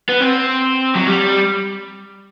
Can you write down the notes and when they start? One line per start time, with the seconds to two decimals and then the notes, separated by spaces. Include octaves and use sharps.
0.09 B3
0.21 C4
0.95 F#3
1.07 G3